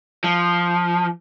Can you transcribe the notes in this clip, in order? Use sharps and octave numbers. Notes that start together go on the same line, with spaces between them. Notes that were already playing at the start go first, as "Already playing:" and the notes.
F3